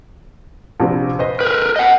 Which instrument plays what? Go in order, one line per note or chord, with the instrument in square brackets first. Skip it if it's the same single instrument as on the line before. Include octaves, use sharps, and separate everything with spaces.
[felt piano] A#1 C3 C4
B4 C5 D#5
[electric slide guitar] A#4 B4 [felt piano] G6
[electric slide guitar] D#5 F#5